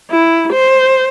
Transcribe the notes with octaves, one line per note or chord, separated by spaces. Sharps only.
E4
C5